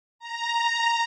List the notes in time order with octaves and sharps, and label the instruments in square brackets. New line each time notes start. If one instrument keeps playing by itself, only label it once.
[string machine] A#5